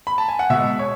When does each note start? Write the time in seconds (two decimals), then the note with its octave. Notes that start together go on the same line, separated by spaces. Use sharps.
0.07 B5
0.18 A5
0.28 G#5
0.39 F#5
0.50 B2 G#3 E5
0.79 C#5